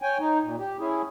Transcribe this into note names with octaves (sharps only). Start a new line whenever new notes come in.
C#5 G5 G#5
D#4
A#2
G4
C#4 E4 G#4